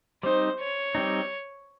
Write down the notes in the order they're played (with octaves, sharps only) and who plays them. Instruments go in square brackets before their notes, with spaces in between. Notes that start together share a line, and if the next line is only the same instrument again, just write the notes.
[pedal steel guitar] G3 C4 D#4 [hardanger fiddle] C5
[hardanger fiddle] C#5
[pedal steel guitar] G3 C4 D#4